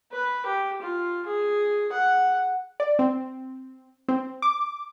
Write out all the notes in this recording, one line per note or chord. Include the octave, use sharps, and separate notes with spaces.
B4
G4
F4
G#4
F#5
D5
C4
C4
D6